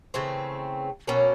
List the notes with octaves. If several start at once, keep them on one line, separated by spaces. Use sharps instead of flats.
C#3 E3 A3 C4
B2 F#3 A#3 C#4